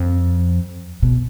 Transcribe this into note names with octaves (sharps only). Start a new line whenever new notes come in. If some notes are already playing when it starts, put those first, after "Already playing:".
Already playing: F2
B2